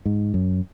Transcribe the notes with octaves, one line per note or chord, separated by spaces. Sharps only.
G#2
F#2